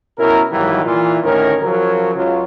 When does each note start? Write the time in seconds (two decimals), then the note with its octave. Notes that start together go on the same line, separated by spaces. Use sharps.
0.18 B2 C#4 E4 A#4
0.52 G#2 D#3 E3 F#3 G3 A#3
0.85 A#2 E3 F4
1.23 D2 A2 D#3 C#4 A#4
1.61 C#3 F3 F#3 A#4
2.16 C#2 F#3 F4